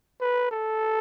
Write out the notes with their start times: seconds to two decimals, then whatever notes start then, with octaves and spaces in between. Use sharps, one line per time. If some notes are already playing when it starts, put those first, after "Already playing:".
0.21 B4
0.51 A4